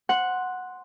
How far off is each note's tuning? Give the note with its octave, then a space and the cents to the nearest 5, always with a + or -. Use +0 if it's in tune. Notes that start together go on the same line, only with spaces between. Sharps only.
F#5 -5 C6 +0